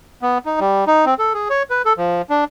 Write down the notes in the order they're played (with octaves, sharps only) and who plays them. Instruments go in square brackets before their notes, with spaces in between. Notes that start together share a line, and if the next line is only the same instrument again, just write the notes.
[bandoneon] B3
D#4
G3
D#4
C4
A4
G#4
C#5
B4
A4
F3
D4